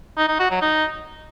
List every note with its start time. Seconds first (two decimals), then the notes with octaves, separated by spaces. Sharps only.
0.17 D#4
0.28 D#4
0.39 F#4
0.50 F#3
0.62 D#4